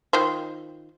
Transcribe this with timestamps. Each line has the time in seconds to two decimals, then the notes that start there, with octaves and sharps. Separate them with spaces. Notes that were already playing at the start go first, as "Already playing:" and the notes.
0.13 D#3 F4 C5